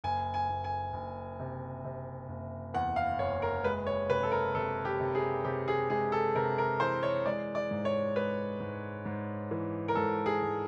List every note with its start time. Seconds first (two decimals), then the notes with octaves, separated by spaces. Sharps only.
0.04 F#1 G#5
0.34 G#5
0.49 F#1
0.64 G#5
0.93 F#1
1.39 C3
1.84 C3
2.29 F#1
2.74 E2 F#5
2.96 F5
3.19 F#1 C#5
3.42 A#4
3.64 G#3 B4
3.87 C#5
4.09 C3 B4
4.23 A4
4.32 A#4
4.55 C3 A4
4.85 G4
5.00 C3
5.15 G#4
5.44 C3 G4
5.68 G#4
5.89 G#3 G#4
6.12 A4
6.35 C3 A#4
6.58 A#4
6.80 E3 C5
7.03 C#5
7.25 G#3 D5
7.55 D5
7.71 G#2
7.85 C#5
8.16 G#3 B4
8.60 G#2
9.05 G#2
9.51 E3
9.88 A#4
9.95 G#2 A4
10.26 G#4
10.42 G#2